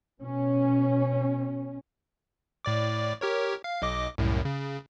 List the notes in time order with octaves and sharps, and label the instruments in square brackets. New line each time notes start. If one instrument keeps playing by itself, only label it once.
[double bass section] B2 C#4
[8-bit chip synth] A2 D5 D6
G4 A#4 C#5
F5
B1 D#5 D6
C2 F#2 A2
C#3